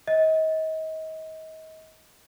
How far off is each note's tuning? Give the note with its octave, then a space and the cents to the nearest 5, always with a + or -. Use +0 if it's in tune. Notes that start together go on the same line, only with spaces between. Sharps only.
D#5 +30